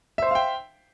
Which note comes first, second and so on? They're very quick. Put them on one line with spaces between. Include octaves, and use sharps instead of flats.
E5 C5 C6 F5 G5